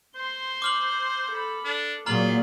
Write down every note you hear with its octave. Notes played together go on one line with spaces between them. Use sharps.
C5 C6
D6 F6 F#7
A4 B5
D4 A4
A#2 F#3 A#3 F4 G#4 A#5 F6 F#7